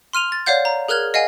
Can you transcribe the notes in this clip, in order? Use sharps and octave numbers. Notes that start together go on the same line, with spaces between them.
C6 F6 D#7 F7
A6
C#5 D5 F5 F#5 G6
A#5
G#4 A#4 F6 F#6 G#6
D#5 F5 F#5 G#5